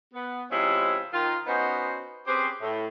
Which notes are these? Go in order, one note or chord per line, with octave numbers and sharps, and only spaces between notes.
B3
C3 F3 G#3 C#4 E4
D#3 F4
B3 C#4 D#4 F#4 C5
C4 C#4 G4 G#4 B4 C5
A2